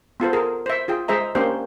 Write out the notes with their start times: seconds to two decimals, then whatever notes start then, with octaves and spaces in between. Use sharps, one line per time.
0.20 B3 F4 A4 C5
0.33 G#4 A#4
0.66 C5 E5
0.88 F4 G#4 G5
1.08 G#3 G#4 C5 E5 A#5
1.35 A#3 C#4 D4 G4 C5